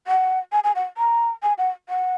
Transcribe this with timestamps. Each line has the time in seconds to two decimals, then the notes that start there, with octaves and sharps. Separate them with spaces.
0.07 F#5
0.52 G#5
0.64 G#5
0.75 F#5
0.97 A#5
1.43 G#5
1.58 F#5
1.89 F#5